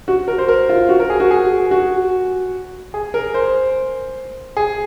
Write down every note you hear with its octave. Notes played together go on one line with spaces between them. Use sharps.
F#4
A#4
C5
A#4
F4
F#4
A#4
G#4
F#4
G#4
F#4
G#4
A#4
C5
G#4